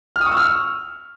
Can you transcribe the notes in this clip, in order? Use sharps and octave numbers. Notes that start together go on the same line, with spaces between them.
F6
D#6
C#6
E6
F6